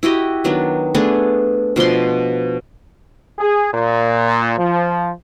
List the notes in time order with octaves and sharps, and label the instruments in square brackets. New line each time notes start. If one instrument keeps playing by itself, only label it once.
[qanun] E4 F#4 G4 D#5
D#3 F#3 B3 D4
A3 B3 D4 G#4
B2 F3 D4 C6
[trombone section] G#4
A#2
F3